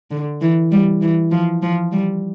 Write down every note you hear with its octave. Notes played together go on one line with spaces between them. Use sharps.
D3
E3
G3
E3
F3
F3
G3